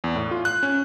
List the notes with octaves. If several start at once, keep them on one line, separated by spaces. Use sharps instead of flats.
E2
A2
F4
F#6
C#4